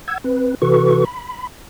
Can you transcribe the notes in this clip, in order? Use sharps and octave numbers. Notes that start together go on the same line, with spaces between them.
F#5 E6 G#6
C4 B4
C3 E3 F#4 A4 B4 C#6
B5